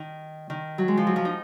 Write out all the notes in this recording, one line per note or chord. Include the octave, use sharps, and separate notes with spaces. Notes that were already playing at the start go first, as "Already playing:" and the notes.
Already playing: D#3
D#3
F#3
G#3
F3
F#3
F3
D#4